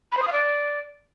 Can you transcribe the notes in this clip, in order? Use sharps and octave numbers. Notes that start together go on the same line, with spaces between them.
B5
C5
D#6
F5
D5